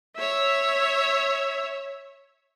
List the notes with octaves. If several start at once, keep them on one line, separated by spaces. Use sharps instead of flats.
C#5 E5